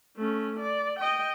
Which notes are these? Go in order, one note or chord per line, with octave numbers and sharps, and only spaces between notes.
A3 C#4
D5
D#5 G5